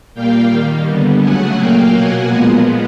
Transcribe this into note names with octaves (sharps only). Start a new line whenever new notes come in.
A#2 G3 A#3 F5 G5
D#3 G3 A#3
D3 G3 B3
C#3 F#3 A3 F#5 G#5
A#2 F#3 A#3 F5 G5
B2 F#3 A#3 F#5 G#5
A#2 F3 G#3 B3